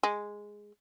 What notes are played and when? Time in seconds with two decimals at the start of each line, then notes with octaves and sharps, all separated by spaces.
0.03 G#3